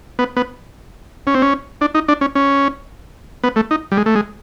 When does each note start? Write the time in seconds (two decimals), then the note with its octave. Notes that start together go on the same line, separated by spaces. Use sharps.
0.19 B3
0.37 B3
1.27 C#4
1.35 C4
1.42 C#4
1.81 D4
1.95 D#4
2.08 D4
2.21 C#4
2.35 C#4
3.44 B3
3.56 A3
3.71 D#4
3.92 G3
3.97 G#3
4.06 A3
4.15 G#3